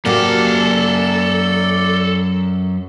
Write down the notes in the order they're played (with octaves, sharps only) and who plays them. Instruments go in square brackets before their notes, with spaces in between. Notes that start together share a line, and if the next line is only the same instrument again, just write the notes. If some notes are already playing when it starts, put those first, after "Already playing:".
[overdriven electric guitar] F#2 F5 [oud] A#3 F#4 G4 [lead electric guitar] A4 [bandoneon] D5